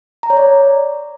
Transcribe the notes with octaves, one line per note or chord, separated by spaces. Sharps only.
A#5
C#5
D5